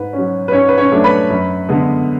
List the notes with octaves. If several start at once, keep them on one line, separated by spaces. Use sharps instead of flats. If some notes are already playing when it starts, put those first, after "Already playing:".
Already playing: G#2 B4
C#4
F#3
B4
G#2 C#4 C#5
B4
C#4 C#5
F#3 A3 D4
B4 B5
F#2
D3 G#3 B3